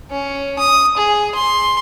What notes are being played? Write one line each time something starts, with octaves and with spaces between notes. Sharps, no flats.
C#4
D#6
G#4
C6